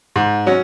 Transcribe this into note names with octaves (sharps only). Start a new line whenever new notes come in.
G#2
F#3 C#4